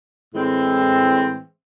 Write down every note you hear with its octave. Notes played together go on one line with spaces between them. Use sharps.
A2 E3 G#3 C4